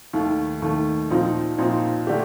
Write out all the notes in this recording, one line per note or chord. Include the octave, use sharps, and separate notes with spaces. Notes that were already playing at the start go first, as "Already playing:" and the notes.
D#2 D#3 A3
D#2 D#3 A3
A#2 F3 C4 D#4
A#2 F3 C4 D#4
D3 A3 D4 G4